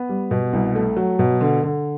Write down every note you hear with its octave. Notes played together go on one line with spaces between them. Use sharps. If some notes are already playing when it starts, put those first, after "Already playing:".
Already playing: B3
G3
B2
C2
A3
F#3
B2
D3
D3